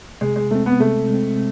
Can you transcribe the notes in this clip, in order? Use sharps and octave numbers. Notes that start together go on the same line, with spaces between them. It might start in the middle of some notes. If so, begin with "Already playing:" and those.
C3 G#3
G#3
G#3 A3 C4
B3
C3 A3
G#3 C4